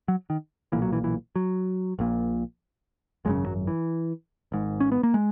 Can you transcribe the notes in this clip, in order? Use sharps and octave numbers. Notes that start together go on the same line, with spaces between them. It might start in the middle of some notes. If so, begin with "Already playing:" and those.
F#3
D#3
B1 A#2 E3
F#3
E3
E3
F#3
A#1 A#2
G#1 F#2 C#3 G#3
F#3
E3
G#1 G#2
C#4
B3
A#3
G#3